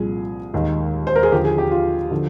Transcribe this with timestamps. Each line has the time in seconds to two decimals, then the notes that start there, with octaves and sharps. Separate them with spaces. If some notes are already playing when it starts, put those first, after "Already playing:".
Already playing: C2 A#2 F3 G#4
0.53 D#2 D#3 G#3
1.07 C5
1.16 A#4
1.23 G#4
1.32 D#2 D3 F3 G4
1.45 G#4
1.58 G4
1.71 F4
2.11 D3 F3